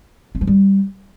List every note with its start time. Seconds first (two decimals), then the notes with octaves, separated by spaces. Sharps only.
0.35 C4
0.41 F3
0.47 G3